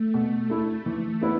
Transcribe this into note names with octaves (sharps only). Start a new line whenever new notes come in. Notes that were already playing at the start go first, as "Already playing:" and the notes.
Already playing: A3
B2
A3 E4
E3
B3 E4 B4